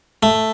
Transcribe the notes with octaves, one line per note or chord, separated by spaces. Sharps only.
A3